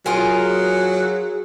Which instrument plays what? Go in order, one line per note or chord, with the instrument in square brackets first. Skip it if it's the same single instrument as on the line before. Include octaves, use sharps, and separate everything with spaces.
[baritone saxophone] F#3 [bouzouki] F4 G#4 A#4